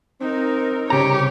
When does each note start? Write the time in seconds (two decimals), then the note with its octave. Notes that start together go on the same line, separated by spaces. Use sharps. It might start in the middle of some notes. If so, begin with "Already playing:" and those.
0.21 C4 D#4 A#4
0.90 C2 C#3 G4 C#5 A#5